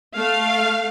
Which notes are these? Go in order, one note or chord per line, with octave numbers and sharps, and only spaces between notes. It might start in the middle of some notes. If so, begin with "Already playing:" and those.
A3 F5